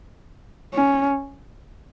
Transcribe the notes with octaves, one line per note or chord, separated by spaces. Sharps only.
C#4